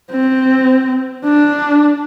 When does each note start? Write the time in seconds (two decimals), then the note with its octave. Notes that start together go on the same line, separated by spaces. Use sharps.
0.10 C4
1.24 D4